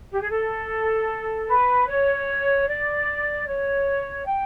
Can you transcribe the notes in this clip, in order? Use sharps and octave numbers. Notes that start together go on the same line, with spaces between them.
G4
G#4
A4
B4
C#5
D5
C#5
G5